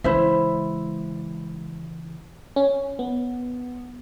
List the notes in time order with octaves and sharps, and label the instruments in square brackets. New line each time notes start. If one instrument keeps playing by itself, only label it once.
[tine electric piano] C#3 E3 [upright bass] G#3 [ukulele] E4 C5 E5
[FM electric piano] C#4
B3